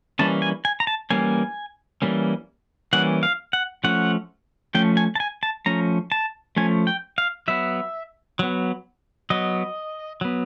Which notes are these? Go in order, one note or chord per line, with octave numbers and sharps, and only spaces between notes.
E3 G3 A#3 C#4 A5
G#5
G#5
A#5
A5
E3 G3 A#3 C#4 G#5
E3 G3 A#3 C#4
E3 G3 A#3 C#4 F#5
F5
F#5
F3 A3 C#4 F#5
F3 A3 C#4 G5
G#5
A5
G#5
A5
F3 A3 C#4 A#5
A5
F3 A3 C#4 G#5
G5
F5
F#3 B3 E5
F#3 B3
F#3 B3 D#5
F#3 B3